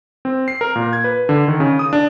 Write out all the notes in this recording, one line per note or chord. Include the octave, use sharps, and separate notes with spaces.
C4
C7
A#4
A#2
G#6
B4
D3
D#3
C#3
D#6
D4